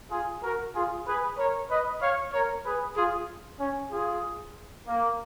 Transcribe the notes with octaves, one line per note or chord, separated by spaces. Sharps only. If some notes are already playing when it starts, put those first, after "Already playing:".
F4 G#4
F#4 A#4
F4 G#4
G#4 B4
A#4 C#5
B4 D#5
C#5 F5
A#4 C#5
G#4 B4
F4 G#4
C#4
F4 G#4
A#3